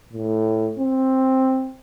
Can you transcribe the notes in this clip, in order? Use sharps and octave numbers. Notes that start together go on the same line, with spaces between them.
A2
C4